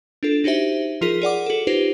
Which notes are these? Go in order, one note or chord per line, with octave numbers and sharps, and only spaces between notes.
D4 F4 A4
D#4 F#4 G4 C5 E5
F3 F4 G#4 A#4 B6
G#4 D5 F#5 D6
F#4 A4
D#4 F4 G4 B4 C5